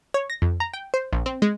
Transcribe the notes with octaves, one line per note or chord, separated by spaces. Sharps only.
C#5
A#6
F2
A#5
G5
C5
A#1
C4
G#3